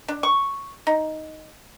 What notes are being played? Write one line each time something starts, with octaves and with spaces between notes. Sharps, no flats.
D4
C#6
D#4